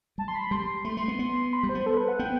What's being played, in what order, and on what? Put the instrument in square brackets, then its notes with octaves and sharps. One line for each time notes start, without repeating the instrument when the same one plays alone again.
[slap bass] G3 [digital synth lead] A5
[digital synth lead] C6
B5
[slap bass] G3 [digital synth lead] C6
[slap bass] A3 [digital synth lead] C6
[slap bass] A3
B3
B3
[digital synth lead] B5
[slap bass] G3
[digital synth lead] C5
[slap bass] B3
[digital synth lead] A4
B4
F#5
[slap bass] B3 [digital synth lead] G5